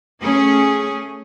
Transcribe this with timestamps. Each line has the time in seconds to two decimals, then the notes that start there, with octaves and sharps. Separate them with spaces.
0.22 A3 C#4 G#4